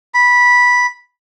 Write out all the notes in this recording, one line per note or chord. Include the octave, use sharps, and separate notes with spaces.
B5